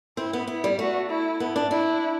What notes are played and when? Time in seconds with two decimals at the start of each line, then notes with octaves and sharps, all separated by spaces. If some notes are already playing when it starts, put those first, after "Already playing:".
0.17 C4 E4
0.33 B3
0.48 B3 E4
0.64 G3
0.79 A3 F#4
1.10 E4
1.40 B3
1.56 D4
1.71 D4 E4